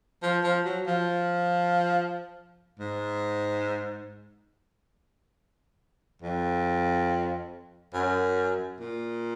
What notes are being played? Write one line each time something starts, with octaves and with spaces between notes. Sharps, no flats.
F3
F3
F#3
F3
G#2
F2
F#2
A#2